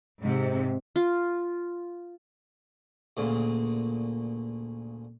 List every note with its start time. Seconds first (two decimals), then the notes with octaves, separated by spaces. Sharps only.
0.21 G#2 C3
0.96 F4
3.17 D2 A#2 C#3